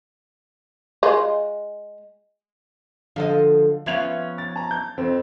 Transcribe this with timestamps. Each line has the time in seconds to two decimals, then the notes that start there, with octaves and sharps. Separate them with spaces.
1.03 G#3 F4
3.16 D3 F3 A4 D#5
3.86 F3 B3 C#4 E5 G#6 F7
4.38 A6
4.56 A5 A#5
4.71 G6
4.98 F2 C4